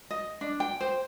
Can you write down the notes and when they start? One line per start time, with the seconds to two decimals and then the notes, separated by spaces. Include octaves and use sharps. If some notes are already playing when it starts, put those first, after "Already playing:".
0.11 D#5
0.41 D4
0.60 G5
0.81 C5